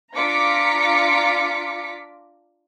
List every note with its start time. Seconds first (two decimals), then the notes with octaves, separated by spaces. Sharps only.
0.15 D4 F4 A#5 D6 B6 C#7